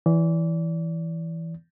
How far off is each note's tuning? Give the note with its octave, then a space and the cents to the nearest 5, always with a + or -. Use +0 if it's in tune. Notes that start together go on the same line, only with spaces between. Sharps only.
E3 +0 D5 -30